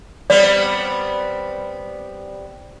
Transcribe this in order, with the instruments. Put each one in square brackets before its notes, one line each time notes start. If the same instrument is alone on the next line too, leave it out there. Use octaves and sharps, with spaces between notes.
[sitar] G3 B3 C4 [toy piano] D5